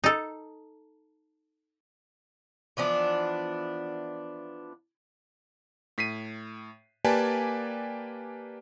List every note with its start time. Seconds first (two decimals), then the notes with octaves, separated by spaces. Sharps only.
0.04 D#4 A4
2.77 E3 F3 B3 D4
5.98 A2 B6 C7 D#7
7.04 A#3 G4 B4 D5 G#5 A5